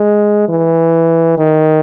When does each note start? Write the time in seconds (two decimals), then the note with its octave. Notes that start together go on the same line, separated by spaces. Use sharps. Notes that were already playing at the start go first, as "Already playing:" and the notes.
Already playing: G#3
0.49 E3
1.38 D#3